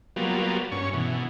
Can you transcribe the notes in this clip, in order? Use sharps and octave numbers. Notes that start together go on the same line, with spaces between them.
F#3 G3 A#3 B3 F4
G2 C#4 C#6
B2 E3